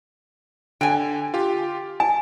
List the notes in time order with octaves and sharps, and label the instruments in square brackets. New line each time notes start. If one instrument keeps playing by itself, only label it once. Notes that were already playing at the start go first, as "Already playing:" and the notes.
[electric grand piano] D3 [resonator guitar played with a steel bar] G5 G#5
[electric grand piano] F4 G4
[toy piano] G#5 [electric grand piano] A5